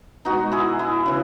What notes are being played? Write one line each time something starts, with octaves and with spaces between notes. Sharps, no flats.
B2 G#3 D#4 F#4
E4 G#4
E4 G#4
C#3 E3